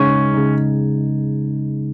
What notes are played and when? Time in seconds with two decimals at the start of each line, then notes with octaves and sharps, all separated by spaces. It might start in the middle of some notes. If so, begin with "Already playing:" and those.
Already playing: C#3 G#3 C#4 D#4
0.34 C#3 G#3 D#4